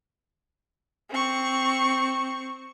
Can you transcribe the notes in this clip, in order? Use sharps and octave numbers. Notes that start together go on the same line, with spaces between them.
C4 C#6